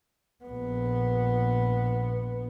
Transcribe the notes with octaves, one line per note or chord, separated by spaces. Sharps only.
A#1 B3